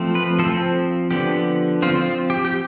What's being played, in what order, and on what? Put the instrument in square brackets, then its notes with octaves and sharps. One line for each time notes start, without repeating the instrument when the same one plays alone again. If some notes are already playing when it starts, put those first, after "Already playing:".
Already playing: [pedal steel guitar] F3 A3 C4
B4
F3 C4 A4
D3 F3 B3 G4
F3 C4 F4
F4
G4
G4